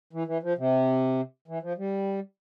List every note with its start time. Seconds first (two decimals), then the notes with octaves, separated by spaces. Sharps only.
0.13 E3
0.27 E3
0.43 F3
0.58 C3
1.48 E3
1.63 F3
1.78 G3